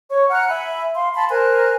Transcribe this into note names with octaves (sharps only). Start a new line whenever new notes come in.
C#5 C#6
F#5 A#5 F6 F#6
E5 G#5 B5
F5 C6
A5 B5 C6
A#4 C5 G#5 F#6